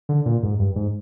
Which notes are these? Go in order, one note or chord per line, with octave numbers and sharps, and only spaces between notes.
D3
A#2
G#2
G2
G#2